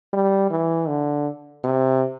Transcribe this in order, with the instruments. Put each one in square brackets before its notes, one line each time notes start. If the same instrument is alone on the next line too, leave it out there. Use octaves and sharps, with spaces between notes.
[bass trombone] G3
E3
D3
C3